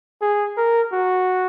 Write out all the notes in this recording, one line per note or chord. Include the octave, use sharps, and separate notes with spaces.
G#4
A#4
F#4